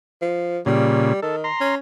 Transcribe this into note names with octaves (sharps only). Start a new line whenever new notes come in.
F3
A#2 C#3 G3
D#3 A4
A#5 C6
C#4